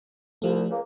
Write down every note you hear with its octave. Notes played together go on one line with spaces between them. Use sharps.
C2 F3 A3
C#2 A#3